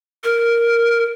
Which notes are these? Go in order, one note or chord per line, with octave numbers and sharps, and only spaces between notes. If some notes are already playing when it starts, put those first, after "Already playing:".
A#4